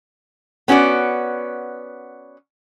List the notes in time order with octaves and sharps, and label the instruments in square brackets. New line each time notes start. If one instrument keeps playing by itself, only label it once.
[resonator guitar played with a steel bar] B3 C#4 F#4 G4 D5